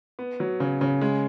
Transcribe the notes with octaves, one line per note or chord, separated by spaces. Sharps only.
B3
F#3
C#3
C#3
G#3